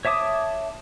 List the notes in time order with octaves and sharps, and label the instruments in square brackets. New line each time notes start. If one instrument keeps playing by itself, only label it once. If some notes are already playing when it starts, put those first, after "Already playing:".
[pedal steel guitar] C#5 E5 A5 D6 D#6